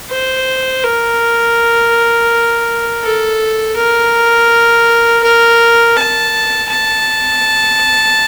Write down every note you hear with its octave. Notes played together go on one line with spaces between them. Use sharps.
C5
A#4
A4
A#4
A#4
A5
A5